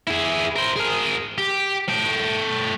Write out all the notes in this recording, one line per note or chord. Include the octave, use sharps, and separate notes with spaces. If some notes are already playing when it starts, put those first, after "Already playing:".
E4 G#4
A#4 C5
G#4 A#4
G4
A3 G5